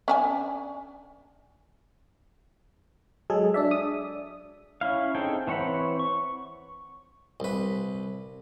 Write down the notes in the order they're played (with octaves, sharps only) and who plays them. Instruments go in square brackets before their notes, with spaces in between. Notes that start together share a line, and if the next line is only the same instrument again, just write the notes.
[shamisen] C#4 D4 G#5
[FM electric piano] F#3 G#3 G#4 A4
D4 D5 E5
D#6
[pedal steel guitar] C#4 E4 F5
C4 D#4 G#4 A4 G5
E3 C4 C#5 F#5 B5
C#6
[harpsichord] C2 B4